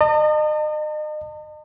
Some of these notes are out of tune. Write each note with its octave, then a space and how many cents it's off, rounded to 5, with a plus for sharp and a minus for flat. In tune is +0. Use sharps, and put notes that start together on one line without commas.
D#5 -35 A5 +45